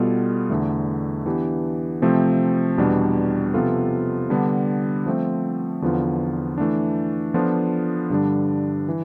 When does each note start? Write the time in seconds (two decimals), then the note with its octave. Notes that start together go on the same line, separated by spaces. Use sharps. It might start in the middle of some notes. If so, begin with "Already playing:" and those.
Already playing: B2 G3 B3 F4 A4
0.50 E2 D3 A3
1.26 E3 B3 D4 G4
2.02 C3 F3 A3 C4
2.78 E2 B2 G3 D4
3.54 C3 F3 B3 F4 A4
4.30 D3 G3 B3 D4
5.06 F3 A3 C4
5.82 E2 D3 F3 B3 F4
6.58 E3 A3 D4
7.34 F3 B3 D4 F4 A4
8.10 G2 D3 G3 D4
8.89 E3